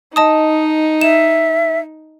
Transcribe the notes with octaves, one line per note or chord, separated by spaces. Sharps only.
D#4 D#5 A5 D#6
E5 E7